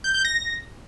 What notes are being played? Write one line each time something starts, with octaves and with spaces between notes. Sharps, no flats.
G6
G6
A#6